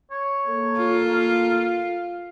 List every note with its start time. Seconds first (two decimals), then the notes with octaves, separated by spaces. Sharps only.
0.11 C#5
0.47 A#3 A4
0.78 F4
1.12 F5
1.50 F5